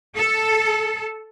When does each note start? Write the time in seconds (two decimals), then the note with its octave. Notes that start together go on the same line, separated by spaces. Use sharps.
0.16 A4